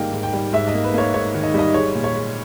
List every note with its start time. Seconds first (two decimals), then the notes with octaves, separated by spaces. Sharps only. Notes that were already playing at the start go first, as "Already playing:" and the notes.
Already playing: G#2 D#3 G3 A#3 D#5 G5
0.12 G#2
0.23 G5
0.33 G3
0.53 G#2 E5
0.68 D#5
0.74 A#3
0.84 B4
0.94 A#3 C#5
1.14 G#2 C#5
1.35 D#3
1.43 D#5
1.54 G3 D#5
1.74 G#3 C#5
1.95 A#2
2.04 C#5
2.15 G#3